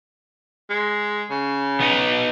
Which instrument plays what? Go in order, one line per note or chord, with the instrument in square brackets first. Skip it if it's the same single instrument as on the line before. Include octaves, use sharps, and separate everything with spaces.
[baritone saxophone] G#3
C#3
[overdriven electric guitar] B3 D#4